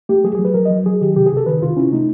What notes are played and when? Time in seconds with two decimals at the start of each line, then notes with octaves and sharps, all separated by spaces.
0.09 A3 G4
0.24 F#3 G#4
0.35 F#3 G#4
0.45 B4
0.54 F#3 A#4
0.65 F#3 D#5
0.86 F#3 G#4
1.01 D#3 G4
1.16 C3 G4
1.26 G#4
1.32 C3
1.37 A4
1.46 D#3 B4
1.61 C3 F4
1.77 C#4 E4
1.92 A3 D#4